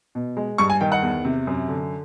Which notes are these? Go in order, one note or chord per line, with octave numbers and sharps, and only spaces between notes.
B2
G#3
G2 C#6
G#5
D#3 G5
F#5
E2
C3
F#2
D3